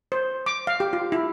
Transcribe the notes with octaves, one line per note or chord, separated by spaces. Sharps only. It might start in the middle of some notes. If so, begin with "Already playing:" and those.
C5
D6
F5
G4
F4
E4